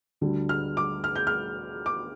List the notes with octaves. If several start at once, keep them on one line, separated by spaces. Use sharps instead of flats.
D2 D3 G3
F6
D6
F6
G6
F6
D6